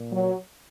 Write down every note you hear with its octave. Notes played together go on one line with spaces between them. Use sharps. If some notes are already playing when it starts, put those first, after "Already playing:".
Already playing: A#2
F#3